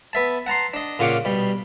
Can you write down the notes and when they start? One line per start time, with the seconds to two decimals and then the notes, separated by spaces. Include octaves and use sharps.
0.13 B3 E5 A5
0.47 F#5 A5 A#5 C6
0.74 D4 D#5
0.99 A#2 C#3 F4 F#5 C#6 D6
1.25 B2 G3